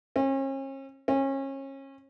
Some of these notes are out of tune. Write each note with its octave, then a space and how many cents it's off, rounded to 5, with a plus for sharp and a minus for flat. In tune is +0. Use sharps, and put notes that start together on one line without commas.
C#4 -40
C#4 -30